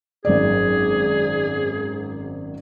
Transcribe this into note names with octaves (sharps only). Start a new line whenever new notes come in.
G#1 F#2 G#4 D5